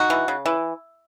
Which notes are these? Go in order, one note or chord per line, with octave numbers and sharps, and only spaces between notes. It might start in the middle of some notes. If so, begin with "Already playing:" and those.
Already playing: D#4 F#4
E3
C#3
E3